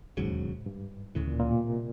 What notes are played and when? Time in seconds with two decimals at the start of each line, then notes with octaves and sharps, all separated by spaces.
0.17 E1 D#2 G#2 C#3 F#3
0.66 G2
1.15 D2 A2 C#3 E3
1.28 A#2
1.40 A#2
1.53 B2
1.64 C3